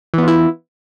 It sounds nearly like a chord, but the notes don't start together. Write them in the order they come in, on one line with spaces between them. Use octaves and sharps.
E3 B3 F4 E4